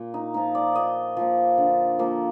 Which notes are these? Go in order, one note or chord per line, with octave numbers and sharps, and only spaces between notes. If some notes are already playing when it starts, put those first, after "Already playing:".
Already playing: A#2
D#4
F3 A#3 D#4
D5
A#2 D#5
F3 A#3
D3
F3 A#3